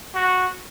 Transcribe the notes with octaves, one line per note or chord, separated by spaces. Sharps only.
F#4